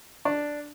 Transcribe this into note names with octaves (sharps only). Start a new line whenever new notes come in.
D4